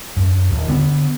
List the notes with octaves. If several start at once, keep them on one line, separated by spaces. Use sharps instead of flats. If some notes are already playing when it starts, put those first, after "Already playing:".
F#2
D#1 D#2
D3 B3